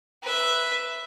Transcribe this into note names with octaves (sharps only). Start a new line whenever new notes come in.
B4 E5